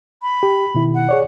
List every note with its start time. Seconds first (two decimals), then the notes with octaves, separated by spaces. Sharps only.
0.22 B5
0.43 G4
0.75 B2 D#3 E4
0.95 F#5
1.09 G#4 C#5 D5